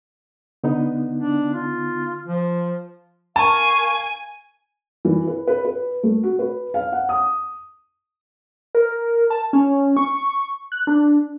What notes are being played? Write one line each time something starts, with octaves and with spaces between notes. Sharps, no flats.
D3 B3 D#4
D4
F4
F3
A#4 F5 G#5 A5 C#6
E3
B4
B4
B4
A3
F#4
B4
F5
F#5
D#6
A#4
A5
C#4
C#6
F#6
D4